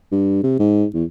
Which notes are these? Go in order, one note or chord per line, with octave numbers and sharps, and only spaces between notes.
G2
C3
G#2
E2